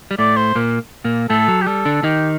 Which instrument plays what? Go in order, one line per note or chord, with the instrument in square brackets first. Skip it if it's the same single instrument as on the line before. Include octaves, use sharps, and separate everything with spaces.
[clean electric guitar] G3
[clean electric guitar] A2 A3 [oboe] D5
[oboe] C5
[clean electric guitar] A#2 A#3
A#2 A#3
[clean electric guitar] A2 A3 [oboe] A4
[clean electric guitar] F#3
[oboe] G4
[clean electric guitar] G3 [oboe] A4
[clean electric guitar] D3 D4
[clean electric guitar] D#3 D#4 [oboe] G4